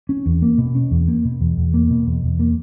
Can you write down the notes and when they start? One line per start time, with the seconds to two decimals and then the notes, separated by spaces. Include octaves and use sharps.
0.09 C#4
0.26 E2
0.42 A#3
0.58 B2
0.75 C#4
0.91 E2
1.08 A#3
1.25 B2
1.41 E2
1.57 E2
1.74 A#3
1.90 B2
2.07 E2
2.23 E2
2.39 A#3